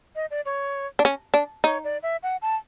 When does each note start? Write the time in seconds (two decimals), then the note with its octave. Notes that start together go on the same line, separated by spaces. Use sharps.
0.16 D#5
0.31 D5
0.46 C#5
0.99 D4
1.05 C#4
1.34 D4
1.64 D#4 C#5
1.84 D5
2.03 E5
2.23 F#5
2.42 A5